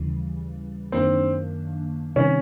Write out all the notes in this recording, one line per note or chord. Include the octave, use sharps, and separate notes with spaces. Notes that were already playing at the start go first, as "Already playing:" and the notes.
Already playing: D#2 C#3 E3 G3
F#2 D#3 F#3 A#3 C4 D4
C3 D#3 G3 C#4